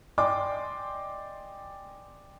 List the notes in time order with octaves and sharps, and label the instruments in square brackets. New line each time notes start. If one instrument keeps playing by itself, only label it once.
[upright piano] D5 D#5 G5 G#5 C6 D6